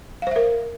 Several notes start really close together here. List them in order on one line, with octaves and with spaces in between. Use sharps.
F5 C5 E5 A#4